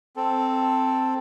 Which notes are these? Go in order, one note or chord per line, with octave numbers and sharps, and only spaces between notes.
C4 A4